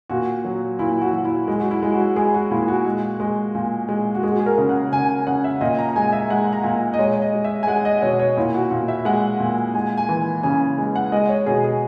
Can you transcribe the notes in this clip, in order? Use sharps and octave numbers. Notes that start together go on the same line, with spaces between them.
A#2 F#4
F#3
A#2 E4
F#4
F#3
E4
G#3
F#4
E4
G#3
F#4
G#3 G#4
F#4
A#2 E4
F#4
G#3
G#3
A#2
G#3
F#4
G#3 G#4
F#4
G#4
A#4
C#3
F#5
C#3 G#5
G#5
C#3 F#5
E5
A#2 D#5
A#5
A#5
G#3 G#5
E5
G#3 F#5
A#5
A#2
D#5
G#3 C#5
D#5
G#3
E5
G#5
G#3 F#5
D#5
B2 C#5
C#5
A#2 E4
F#4
A#2
E5
G#3 F#5
A#2
G#3 G#5
G#5
E3
C#3 G#5
G#3
F#5
G#3 D#5
C#5
B2 G#4
G#4